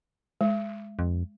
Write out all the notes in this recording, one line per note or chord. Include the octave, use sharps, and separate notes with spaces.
G#3
F2